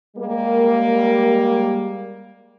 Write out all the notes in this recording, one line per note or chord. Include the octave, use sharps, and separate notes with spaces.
G3 G#3 A#3